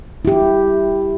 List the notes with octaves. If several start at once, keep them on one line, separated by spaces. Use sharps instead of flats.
E4 G4